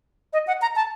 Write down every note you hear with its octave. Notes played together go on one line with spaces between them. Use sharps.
D#5
F#5
A#5
A5